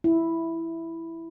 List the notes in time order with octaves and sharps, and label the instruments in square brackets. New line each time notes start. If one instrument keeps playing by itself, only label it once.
[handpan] E4